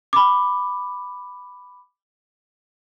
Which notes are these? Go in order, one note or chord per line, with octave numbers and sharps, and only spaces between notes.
B5 D6